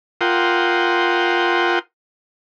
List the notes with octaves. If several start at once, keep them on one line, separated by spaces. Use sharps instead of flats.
F4 A#4 F#5 G5 C6 D#6